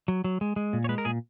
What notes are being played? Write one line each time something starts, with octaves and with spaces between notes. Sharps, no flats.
F#3
F#3
G#3
G#3
A#2
C#5
G#3 B4
A#4
A#2 G#4